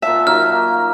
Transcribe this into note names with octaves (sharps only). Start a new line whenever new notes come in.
A#2 E5 F#5 A5
F#3 A#3 D#4 F6